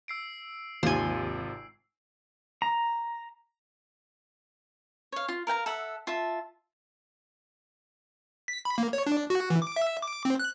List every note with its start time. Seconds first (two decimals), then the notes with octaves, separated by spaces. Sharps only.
0.08 E6 C7 D7
0.83 G#1 D#2 C3 F4 G#5 C6
2.62 A#5
5.12 C#5 F5
5.28 F4
5.47 A#4 F5 G5 A#5
5.66 A4 E5 F#5
6.07 F4 E5 A5
8.48 B6
8.65 B5
8.78 A#3
8.93 C#5
9.07 D4
9.30 F#4
9.50 E3
9.62 D6
9.76 E5
10.02 D6
10.25 C4
10.40 F#6